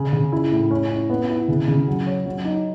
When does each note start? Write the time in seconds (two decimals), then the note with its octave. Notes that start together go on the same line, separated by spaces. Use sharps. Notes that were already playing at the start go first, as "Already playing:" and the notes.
Already playing: C#3
0.13 C#3
0.32 E4
0.52 A2
0.71 C#4
0.90 E4
1.10 B3
1.30 E4
1.48 C#3
1.68 C#3
1.88 F#3
2.06 C#5
2.26 F#3
2.45 D#4